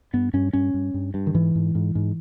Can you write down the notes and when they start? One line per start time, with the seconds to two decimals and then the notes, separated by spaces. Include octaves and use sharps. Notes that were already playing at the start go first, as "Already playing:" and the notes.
0.13 G2 B3
0.33 G2 C#4
0.53 G2 C#4
0.74 G2
0.94 G2
1.14 G2
1.27 D#3
1.34 G#2 E3
1.55 G#2
1.75 G#2
1.95 G#2